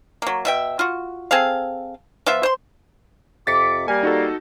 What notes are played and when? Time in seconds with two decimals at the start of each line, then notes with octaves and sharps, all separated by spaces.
0.22 F#3 A#3
0.45 B2 E5 G5
0.79 F4 F#4
1.31 C4 G#4 A4 F5
2.26 F3 B3 F4 E5
2.43 C5 C6
3.47 F2 C3 D6 A6 B6 C#7
3.88 G3 A#3 G#5
4.03 D#4 F#4 A4